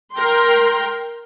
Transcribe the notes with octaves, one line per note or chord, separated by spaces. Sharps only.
A#4 G5 C6